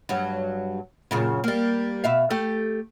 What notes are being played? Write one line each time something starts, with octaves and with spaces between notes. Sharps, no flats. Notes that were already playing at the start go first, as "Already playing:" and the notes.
G2 F#3
F#2 A#2 C#3
G3 A#3
B2 E5 F5
A3 G4